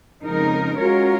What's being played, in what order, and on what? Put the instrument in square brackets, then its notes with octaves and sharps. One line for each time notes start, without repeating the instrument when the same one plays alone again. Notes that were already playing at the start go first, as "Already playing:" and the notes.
[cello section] F2 C#3 G#3 D#4 A#4
[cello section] G#3 C#4 F4 A#4 C#5 [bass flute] F#4